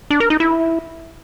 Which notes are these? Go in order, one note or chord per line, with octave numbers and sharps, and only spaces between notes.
D4
A#4
D#4
E4